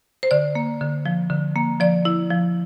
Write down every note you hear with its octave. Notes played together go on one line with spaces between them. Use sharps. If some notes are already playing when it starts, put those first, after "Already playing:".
C5
D3 D5
A#3
D3
F3
D3
A#3
F3 D5
E4
F3